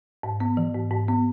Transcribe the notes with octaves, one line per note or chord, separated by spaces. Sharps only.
G#2
B3
E3
G#2
G#2
B3